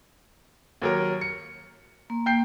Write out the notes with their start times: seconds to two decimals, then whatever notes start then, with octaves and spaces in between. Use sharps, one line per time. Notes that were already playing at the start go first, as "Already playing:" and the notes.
0.82 D#2 F#3 A#4
1.21 C#7
2.10 A#3
2.26 G5 G6 C7